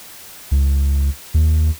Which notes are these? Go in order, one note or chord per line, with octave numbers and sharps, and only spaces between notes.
C#2
D#2